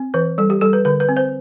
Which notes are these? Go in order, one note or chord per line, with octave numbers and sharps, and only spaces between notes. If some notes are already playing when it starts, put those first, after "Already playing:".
Already playing: C4
E3 B4
G3 A4
G4
G3 A4
B4
D3 B4
B4
C4
C5